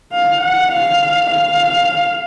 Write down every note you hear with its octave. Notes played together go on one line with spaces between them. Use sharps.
F5
F#5
F5
F5